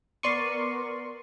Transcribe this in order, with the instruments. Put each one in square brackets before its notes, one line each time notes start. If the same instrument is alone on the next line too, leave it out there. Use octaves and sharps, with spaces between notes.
[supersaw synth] B3 A#4 [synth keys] D5 C6 C#6 [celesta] C7 D#7